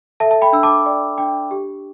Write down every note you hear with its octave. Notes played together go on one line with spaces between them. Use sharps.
A4 E5 A5
A5
G5 B5
D4 E6
A5 D6
D5 G5
D4 G5
G4